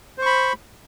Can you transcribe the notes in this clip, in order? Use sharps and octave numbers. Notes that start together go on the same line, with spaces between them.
C5 B5 C#6